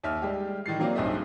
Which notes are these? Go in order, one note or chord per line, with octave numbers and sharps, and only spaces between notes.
D#2 E5 F6
G3 G#3 G4
D#3 E3 A6 C7
F#3 A#3 C4 F4 D5
B1 G2 C4 G#4 D#5 E5